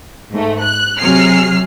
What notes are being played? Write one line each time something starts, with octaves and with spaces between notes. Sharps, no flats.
G#2 A3
F#6
C3 F#3 G#4 F6 C7